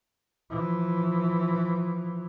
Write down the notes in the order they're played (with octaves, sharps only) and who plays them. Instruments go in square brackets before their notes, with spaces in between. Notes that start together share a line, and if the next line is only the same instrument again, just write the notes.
[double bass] E3 F3